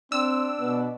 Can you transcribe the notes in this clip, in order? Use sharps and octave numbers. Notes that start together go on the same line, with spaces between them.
C4 D4 E6
B2 B3